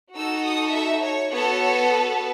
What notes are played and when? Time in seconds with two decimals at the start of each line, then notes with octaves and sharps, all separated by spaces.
0.15 D#4 F#4 A4 E6
0.43 D#6
0.73 E5
1.01 C#5
1.30 B3 F#4 A4 C#5
1.60 C#5
1.90 B4